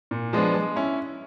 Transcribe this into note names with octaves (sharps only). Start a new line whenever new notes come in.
A#2
F3 G#3 B3 D4
G#3
C#4 E4